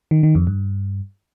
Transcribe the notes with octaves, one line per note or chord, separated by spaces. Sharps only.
D#3
D#3
F2
G2